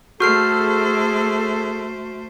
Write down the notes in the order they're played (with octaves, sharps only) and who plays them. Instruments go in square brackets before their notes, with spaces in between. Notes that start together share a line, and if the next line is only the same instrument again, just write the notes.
[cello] A3 C5 [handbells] F#4 F6 C7 [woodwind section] G#4 A4